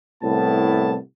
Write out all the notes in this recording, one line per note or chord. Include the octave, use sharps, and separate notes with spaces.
C2 A2 B3 A5